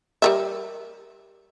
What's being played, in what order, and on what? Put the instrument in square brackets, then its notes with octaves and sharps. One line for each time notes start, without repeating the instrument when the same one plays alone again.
[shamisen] G3 A#4 E5